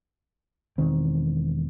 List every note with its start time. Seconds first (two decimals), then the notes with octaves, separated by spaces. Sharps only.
0.78 E1 D#3 C4